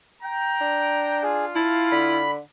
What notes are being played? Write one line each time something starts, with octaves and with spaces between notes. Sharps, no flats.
G5 A#5
D4
F4 G#4 F5
E4 A5
D3 B5